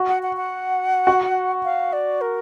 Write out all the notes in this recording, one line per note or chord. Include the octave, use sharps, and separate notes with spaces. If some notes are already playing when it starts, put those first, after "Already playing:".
Already playing: F#4
F#5
F#5
F#5
F#4
F5
D5
A#4